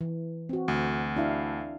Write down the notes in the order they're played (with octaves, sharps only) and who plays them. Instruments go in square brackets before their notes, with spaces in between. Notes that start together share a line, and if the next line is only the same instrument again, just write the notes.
[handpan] E3
C4 F#4
[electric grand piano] D2
[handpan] D4 E4 F5